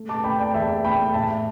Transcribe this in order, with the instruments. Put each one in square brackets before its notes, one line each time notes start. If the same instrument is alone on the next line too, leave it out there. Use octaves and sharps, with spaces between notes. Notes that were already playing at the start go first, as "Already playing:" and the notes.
Already playing: [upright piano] A3
A5 D6
A3 G5 B5
D5 G5
E2 E5 A5
A3 G5 B5
A2 E5 A5